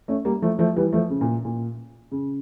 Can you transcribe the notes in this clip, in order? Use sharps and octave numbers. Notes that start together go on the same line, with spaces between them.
A3 C#4
G3 A#3
F3 A3
F3 A3
E3 G3
F3 A3
C#3
A#2
A#2
C#3